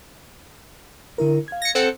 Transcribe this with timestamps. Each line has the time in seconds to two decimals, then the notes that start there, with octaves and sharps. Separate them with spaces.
1.18 D3 E4 A#4
1.48 F5 G#6
1.62 A#6 C#7
1.75 C4 A4 F#5